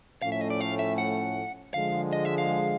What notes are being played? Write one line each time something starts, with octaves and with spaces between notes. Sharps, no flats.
A2 F3 A3 C#4 F5
E5
D#5
D5
F5
E5
F#5
D3 F3 G#3 F5
D#5
E5
F5